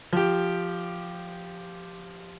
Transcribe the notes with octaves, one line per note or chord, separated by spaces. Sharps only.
F3 G4